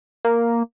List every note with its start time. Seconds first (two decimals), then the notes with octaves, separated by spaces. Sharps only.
0.25 A#3